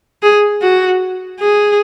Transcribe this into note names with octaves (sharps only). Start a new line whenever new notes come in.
G#4
F#4
G#4